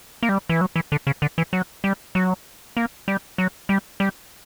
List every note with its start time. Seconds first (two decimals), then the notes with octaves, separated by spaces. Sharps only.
0.23 A#3
0.29 G3
0.49 E3
0.61 F#3
0.76 E3
0.92 D3
1.07 C#3
1.22 D3
1.38 E3
1.53 F#3
1.84 G3
2.15 F#3
2.77 A#3
3.08 G3
3.38 F#3
3.69 G3
4.00 G3